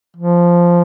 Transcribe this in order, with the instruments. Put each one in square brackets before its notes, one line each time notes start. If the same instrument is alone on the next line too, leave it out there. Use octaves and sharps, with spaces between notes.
[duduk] F3